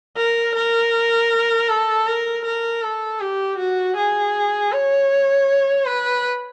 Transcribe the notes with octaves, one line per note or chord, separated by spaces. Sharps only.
A#4
A#4
A4
A#4
A#4
A4
G4
F#4
G#4
C#5
B4